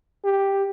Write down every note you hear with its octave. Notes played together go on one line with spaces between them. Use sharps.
G4